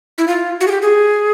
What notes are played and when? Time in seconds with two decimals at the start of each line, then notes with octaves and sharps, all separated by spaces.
0.18 E4
0.28 F4
0.61 F#4
0.67 G#4
0.71 G4
0.82 G#4